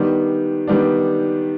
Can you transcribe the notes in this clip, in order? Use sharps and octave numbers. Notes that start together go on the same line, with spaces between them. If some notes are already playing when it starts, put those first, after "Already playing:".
Already playing: D#3 G3 B3 D4
D#3 G3 B3 D4